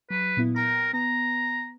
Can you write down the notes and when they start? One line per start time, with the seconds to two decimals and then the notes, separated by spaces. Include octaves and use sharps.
0.10 F#3 B4
0.37 A#2 B3 E4
0.56 A#4 G5 A#5
0.93 B3 A#5